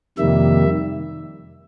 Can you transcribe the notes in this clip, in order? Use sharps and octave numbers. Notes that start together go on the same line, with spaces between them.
F2 C3 D#3 G3 A#3 E5